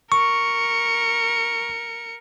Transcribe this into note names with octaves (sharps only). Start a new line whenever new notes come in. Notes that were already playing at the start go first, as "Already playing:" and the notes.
A#4 C#6 C#7